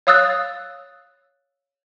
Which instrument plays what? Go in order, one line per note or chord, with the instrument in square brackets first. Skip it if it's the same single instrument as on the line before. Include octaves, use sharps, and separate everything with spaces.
[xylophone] C#5 F5 D#6 E6 F#6 A6